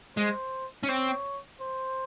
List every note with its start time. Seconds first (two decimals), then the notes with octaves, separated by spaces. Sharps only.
0.17 G#3 C5
0.83 C#4
0.89 C4 C#5
1.61 C5